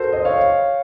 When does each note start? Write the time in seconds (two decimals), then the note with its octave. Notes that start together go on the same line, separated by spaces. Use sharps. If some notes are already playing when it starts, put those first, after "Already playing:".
Already playing: F#4 A4 A#4 C5
0.13 C5 D#5
0.25 C#5 F5